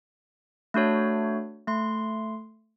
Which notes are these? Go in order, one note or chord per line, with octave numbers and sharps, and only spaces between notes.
A3 D4 F#4 C#5
A3 C6